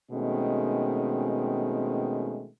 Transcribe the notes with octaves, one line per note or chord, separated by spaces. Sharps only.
B2 D#3 G#3 A3 C4 C#4